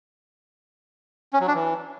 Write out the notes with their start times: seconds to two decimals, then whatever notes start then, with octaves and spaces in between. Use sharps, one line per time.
1.33 C#4
1.40 F#3
1.47 D4
1.54 E3